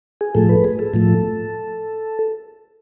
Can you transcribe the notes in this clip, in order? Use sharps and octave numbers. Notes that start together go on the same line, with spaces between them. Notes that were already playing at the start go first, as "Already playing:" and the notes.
G#4
A2 F3 A3 A4
B4
G#4
A4
A2 F3 A3